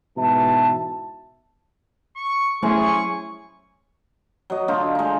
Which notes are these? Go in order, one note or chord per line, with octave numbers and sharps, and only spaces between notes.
G#2 B2 E3 E5 A5
C#6
F#3 A3 C#4 E4 G#4 C6 C#6
F#3 D#5
D3 D#4 F4
G#3 D#4